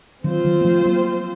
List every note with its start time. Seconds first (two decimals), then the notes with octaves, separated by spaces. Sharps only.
0.24 D#3 F#3 C4 F4 C5
0.45 D#3 F#3
0.61 A#3
0.65 F3 A3
0.86 F#3 A#3